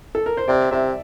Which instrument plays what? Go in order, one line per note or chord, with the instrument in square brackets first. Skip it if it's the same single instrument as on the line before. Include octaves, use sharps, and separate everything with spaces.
[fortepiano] A4
A#4
C5
[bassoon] C3 [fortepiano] D5
[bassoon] C3 [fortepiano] E5